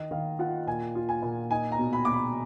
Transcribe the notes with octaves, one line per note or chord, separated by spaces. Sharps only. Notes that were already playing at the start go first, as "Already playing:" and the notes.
Already playing: D#3 D#5
D#3 F5
F4 F#5
A#2 G#5
F4
G#5
A#2
D#4 G#5
A#5
B2
B5
B2 D6
B5